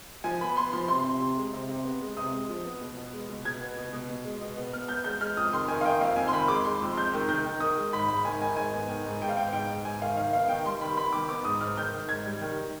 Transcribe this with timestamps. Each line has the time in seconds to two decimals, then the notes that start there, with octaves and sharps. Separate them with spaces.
0.24 F3 G#5
0.41 B3 B5
0.57 B3 C6
0.73 F3 C6
0.88 C3 C6
1.04 C3
1.21 C3
1.37 G#3
1.53 C3
1.69 C3
1.84 B3
2.01 G#3
2.17 C3 D#6
2.32 G#3
2.49 F3
2.65 B3
2.81 B2
2.97 B3
3.13 G#3
3.29 B2
3.45 B2 G#6
3.61 B3
3.77 B2
3.93 B2
4.09 B2
4.25 G#3
4.41 B2
4.57 B3
4.73 B3 F6
4.88 B3 G6
5.04 G#3 G6
5.21 G#3 F6
5.37 F2 D#6
5.53 D#3 C6
5.68 D#3 G#5
5.81 F5
5.84 D#3 G5
6.01 F2 F5
6.16 F2 G#5
6.28 C6
6.33 D#3 B5
6.48 G#3 D6
6.65 G#3 C6
6.81 F2
6.97 G#3 G6
7.13 D#3
7.29 D#3 G6
7.44 D#3
7.60 D#3 D#6
7.77 G#3
7.93 G#2 B5
8.08 G#2 B5
8.25 D#3 G#5
8.41 D#3 G#5
8.57 G#2 G#5
8.74 B3
8.88 D#3
9.06 G#2
9.22 G#2 G5
9.29 F5
9.37 B3 G5
9.53 G#2 G5
9.70 G#2
9.85 G#2 G#5
10.02 D#3 F5
10.17 D#3 F5
10.33 B3 F5
10.49 D#3 G5
10.65 G3 C6
10.81 D#3 B5
10.97 B3 B5
11.13 D#3 D6
11.29 B3 D6
11.45 G#2 D#6
11.61 G#2 F6
11.77 D#3 G6
11.93 D#3
12.09 G#2 G#6
12.25 G3
12.41 D#3